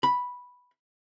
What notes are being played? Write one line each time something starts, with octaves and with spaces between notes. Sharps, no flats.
B5